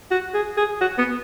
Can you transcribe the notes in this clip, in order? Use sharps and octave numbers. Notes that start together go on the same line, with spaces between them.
F#4
G#4
G#4
F#4
B3